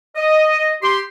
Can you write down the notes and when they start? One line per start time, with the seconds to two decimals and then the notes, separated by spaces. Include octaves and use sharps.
0.16 D#5
0.82 G4 C6